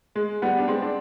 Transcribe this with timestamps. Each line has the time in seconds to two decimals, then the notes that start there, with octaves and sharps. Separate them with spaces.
0.15 G#3
0.42 G3 B3
0.59 D4
0.68 G#3 C4
0.82 D4